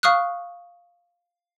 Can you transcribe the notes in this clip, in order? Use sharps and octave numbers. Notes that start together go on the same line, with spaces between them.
F5 C#6 D#6 F6 F#6